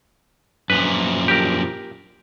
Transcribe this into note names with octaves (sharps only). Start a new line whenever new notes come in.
F#2 A#2 F3 B4
G4 A#4